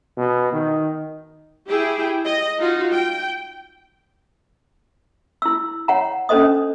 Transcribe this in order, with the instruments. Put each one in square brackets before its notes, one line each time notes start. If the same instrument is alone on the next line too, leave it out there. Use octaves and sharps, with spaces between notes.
[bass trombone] B2
D#3
[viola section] E4 G4 G#4 G5
D#5
D#4 F4 F#4
G5
[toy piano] E4 E6
C#5 F#5 A#5
C#4 D4 A4 C5 D#5 D#6